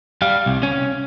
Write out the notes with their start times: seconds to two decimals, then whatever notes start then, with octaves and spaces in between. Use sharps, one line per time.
0.22 G3 F5
0.46 C2
0.63 C#4